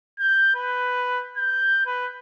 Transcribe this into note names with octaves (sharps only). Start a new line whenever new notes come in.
G6
B4
G6
B4